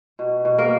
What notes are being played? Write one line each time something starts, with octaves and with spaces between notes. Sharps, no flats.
B2
B2
A#3 A#4